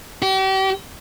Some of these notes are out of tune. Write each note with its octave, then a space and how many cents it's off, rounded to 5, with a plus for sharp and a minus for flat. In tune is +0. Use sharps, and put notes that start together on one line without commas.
G4 -40